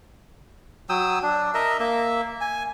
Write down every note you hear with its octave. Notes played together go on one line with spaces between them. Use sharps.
F#3 G5 D#6 E6
D4
A#4 D#5 E5
A#3 E5
G#5